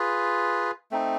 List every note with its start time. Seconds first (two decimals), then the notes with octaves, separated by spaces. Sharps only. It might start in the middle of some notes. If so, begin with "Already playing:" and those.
Already playing: F4 G#4 B4
0.91 A3 C4 D#4